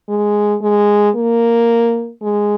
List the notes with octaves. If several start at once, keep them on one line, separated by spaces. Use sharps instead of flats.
G#3
G#3
A#3
G#3